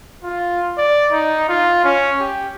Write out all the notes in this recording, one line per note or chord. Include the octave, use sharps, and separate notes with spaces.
F4
D5
D#4
F4
C#4
G4